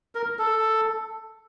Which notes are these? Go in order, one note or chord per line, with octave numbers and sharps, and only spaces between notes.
A#4
A4